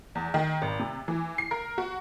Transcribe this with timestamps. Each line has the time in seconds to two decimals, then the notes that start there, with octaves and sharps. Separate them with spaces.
0.15 E2
0.34 D#3
0.62 G#1
0.79 C3
1.08 E3
1.38 C7
1.51 A#4
1.78 F#4